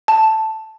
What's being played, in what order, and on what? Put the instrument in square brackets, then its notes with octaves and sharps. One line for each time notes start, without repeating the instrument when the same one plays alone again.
[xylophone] A5